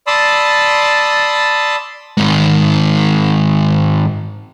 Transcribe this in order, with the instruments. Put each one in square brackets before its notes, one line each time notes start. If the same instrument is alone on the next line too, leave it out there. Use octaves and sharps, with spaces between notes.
[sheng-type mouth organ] D5 A5 B5 C6 D#6 E6
[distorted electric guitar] G#2 D#3